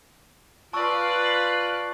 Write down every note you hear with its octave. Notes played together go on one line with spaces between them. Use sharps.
F4 B4 D5 A5 C#6 E6 F#6